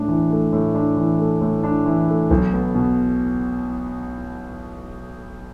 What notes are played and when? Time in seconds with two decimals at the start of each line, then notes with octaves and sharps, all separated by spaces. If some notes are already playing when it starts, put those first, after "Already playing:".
Already playing: A2 D4
0.08 E3
0.30 A3
0.53 A2
0.75 D4
0.97 E3
1.19 A3
1.41 A2
1.64 D4
1.86 E3
2.08 A3
2.30 B1
2.53 B3
2.75 B2